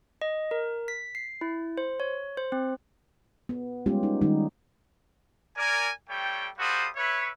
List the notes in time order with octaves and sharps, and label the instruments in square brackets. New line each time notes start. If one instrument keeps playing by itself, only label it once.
[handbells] D#5
A#4
B6
C7
E4
C5
C#5
C5
C4
[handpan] B3
G3 G#3 B3 C#4 F4 G4
D#4
D#3 G3 G#3 D#4
[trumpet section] A#4 D5 G#5
G3 A3 C#5 G5
G3 F#4 A4 C5 F5 D#6
B4 C#5 E5